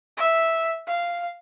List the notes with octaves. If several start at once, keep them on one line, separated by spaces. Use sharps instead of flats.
E5
F5